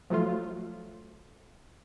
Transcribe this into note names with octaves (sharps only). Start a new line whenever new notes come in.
F3 F#3 A3 F4